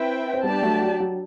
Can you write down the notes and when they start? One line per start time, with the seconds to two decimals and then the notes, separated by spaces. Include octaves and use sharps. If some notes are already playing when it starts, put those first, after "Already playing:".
Already playing: C4 E4 B4 E5 G5
0.34 C4
0.43 G3 B3 D4 G4 D5 A5
0.62 F#3 A3
0.82 F#3
1.00 F#3